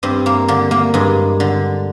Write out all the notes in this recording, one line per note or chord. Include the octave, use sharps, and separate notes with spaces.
G2 C4
A#3
D3 A#3
A#3
G2 G#3
D3